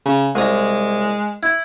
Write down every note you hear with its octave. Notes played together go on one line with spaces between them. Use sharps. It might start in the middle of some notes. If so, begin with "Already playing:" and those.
C#3
C2 G#3 A#5
E4